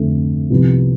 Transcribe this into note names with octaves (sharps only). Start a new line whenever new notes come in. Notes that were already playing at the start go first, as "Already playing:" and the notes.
Already playing: F2 D3 A3
C2 C3 F3 B3